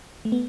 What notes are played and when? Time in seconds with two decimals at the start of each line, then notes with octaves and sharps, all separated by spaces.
0.25 A3
0.32 B3